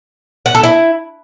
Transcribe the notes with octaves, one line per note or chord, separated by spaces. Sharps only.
F#5
A4
E4